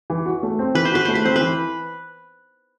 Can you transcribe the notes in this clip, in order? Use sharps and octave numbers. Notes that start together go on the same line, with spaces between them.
E3
F#4
A3
C4
E3 B4
C5
F#4 B4
A3 C5
B4
C4 C5
B4
E3